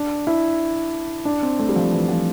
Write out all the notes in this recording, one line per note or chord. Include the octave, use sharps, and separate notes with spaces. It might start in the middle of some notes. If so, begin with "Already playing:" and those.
Already playing: D4
E4
D4
C4
A3
G3
F3
E3
F3